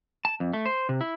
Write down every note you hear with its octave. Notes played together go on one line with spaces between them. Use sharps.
A5
F2
A3
C5
C3
E4